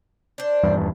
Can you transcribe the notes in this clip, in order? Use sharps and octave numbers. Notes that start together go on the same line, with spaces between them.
D4 C5
D#1 E2 G2